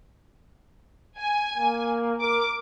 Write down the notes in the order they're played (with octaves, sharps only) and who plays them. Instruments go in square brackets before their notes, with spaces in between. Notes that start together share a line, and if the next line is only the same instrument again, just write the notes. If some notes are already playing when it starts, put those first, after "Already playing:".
[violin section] G#5
[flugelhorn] A#3
[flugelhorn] A#4 [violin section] D6